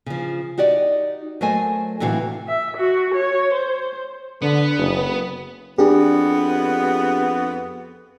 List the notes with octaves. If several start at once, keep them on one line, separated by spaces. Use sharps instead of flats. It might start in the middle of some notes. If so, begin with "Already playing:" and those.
C#3 F3
D#4 F#4 G4 D5 D#5
F#3 A3 A#4 C5 D#5 G#5
A2 C3 E3 F#4 F5
E5
F#4
C#5
C5
D3 B3
F#1
F2 B3 D4 G4 G#4